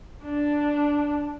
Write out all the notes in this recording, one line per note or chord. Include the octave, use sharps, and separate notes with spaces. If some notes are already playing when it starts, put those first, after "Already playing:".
D4